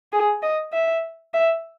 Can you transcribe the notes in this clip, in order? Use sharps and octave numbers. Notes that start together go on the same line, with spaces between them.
G#4
D#5
E5
E5